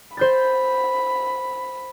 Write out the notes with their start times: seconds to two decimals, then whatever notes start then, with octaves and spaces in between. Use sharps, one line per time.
0.17 C5 B5 G6 A6